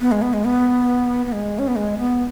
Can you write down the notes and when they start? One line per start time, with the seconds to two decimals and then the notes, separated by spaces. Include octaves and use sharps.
0.01 B3
0.12 G#3
0.22 B3
0.33 G#3
0.45 B3
1.26 B3
1.32 G#3
1.59 C#4
1.68 B3
1.76 G#3
1.98 B3